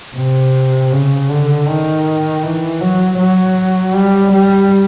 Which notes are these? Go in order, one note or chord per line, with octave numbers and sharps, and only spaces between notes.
C3
C#3
D3
D#3
E3
F#3
F#3
G3
G3